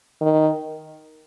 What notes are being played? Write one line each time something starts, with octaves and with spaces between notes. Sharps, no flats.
D#3